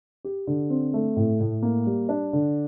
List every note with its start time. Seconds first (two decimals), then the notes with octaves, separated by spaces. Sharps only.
0.24 G4
0.47 D3
0.70 C4
0.94 A3
1.17 A2
1.40 A2
1.62 A#3
1.87 G3
2.09 D4
2.33 D3